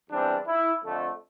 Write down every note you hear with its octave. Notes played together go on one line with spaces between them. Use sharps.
E2 E3 G3 C4 D4
E4
F2 D3 A3